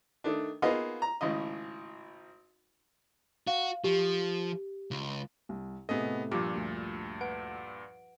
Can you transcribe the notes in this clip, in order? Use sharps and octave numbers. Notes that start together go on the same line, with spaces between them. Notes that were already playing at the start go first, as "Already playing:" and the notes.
D#3 A3 D4
A#3 B3 D#4 F4 G#4 D#5
A#5
G#1 A2 C#3 D#5
F#4 F5
F3 G4
C#2
C2
A2 C3 A3 B3 G#4 D#5
G2 A#2 F3 F4 G4 D6
D2
B4 F#5 D7